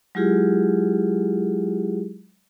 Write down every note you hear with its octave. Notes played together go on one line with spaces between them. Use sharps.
F#3 G#3 E4 F4 G4 G#4